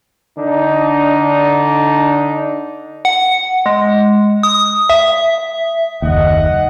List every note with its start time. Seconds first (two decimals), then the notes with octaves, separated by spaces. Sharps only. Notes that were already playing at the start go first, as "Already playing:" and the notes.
0.38 D3 D4 D#4
3.05 F#5
3.66 G#3
4.43 D#6
4.90 E5
6.02 F#1 D#2 D#5 F#5